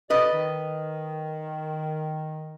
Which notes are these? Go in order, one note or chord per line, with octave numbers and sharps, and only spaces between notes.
F2 G4 B4 D5 D#5
D#3